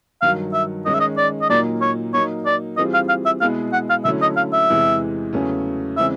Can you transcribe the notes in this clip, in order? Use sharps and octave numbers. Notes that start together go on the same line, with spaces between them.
G2 D#3 F#3 F5
E5
D#3 G#3 C#4 D#5
E5
D#5
D5
D#5
A#2 F#3 A#3 D#4 D5
C#5
F#3 A#3 D#4 C#5
D5
E3 G3 C4 F4 G#4 D#5
F5
F5
E5
B2 G#3 B3 E4 G#4 F5
F#5
F5
D3 F#3 A3 C#4 E4 E5
D#5
F5
E5
E2 C3 E3 G#3
E2 C#3 F#3 A3 C#4
C#3 E3 G#3 C4 E5